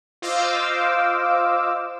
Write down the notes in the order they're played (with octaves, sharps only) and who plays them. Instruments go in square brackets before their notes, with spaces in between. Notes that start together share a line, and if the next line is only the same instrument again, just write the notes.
[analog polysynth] F4 C5 D#5 F5 D6 E6